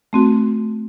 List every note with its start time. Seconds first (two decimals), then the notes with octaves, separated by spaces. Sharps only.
0.13 A3 C4 F#4